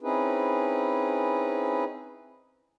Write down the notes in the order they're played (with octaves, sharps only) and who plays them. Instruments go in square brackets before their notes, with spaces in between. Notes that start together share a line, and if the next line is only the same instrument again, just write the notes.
[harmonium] C4 C#4 D#4 E4 G#4 B4